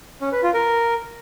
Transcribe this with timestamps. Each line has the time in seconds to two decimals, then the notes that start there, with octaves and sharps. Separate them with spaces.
0.21 C#4
0.32 B4
0.43 F4
0.54 A#4